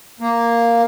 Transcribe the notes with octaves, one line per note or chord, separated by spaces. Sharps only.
A#3